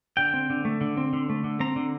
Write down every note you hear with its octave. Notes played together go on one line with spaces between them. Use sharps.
D3 G5
C4
D3
A3
D3
C4
D3
A3
D3
C4 A#5
D3